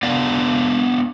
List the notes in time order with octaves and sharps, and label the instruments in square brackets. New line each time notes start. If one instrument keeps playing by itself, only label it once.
[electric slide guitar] B3 D4 D5 F5